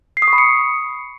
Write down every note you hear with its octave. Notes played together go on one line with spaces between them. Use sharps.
C7
D#6
C#6
B5
C#7